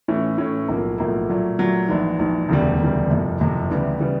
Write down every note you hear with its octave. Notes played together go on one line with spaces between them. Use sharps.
A2 E3 A3 C#4
A2 E3 A3 C#4
B1 A2 F3 A#3
B1 A2 F3 A#3
A#2 F#3 A3
A#2 F#3 A3
A#1 G#2 E3
A#1 G#2 E3
E1 D2 C#3 E3 G3
E1 D2 C#3 E3 G3
F#1 F2 C3
F#1 F2 C3
D2 C#3 E3 G3 B3
C#3 E3 G3 B3